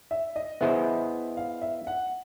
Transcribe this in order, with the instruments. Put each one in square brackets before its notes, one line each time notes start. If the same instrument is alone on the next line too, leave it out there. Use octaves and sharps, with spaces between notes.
[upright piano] E5
D#5
[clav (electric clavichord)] B3 E4 G#4 C5 D#5 [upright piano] E5
[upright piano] F5
E5
F#5